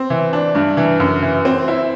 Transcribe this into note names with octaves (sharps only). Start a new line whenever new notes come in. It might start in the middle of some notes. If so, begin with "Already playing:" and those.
Already playing: C4
E3
D4
G2
E3
F#2
E3
C4
E4